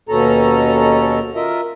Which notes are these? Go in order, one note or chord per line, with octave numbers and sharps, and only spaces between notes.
D#2 B2 C#4 A4 A#5
F4 A#4 D#5 E5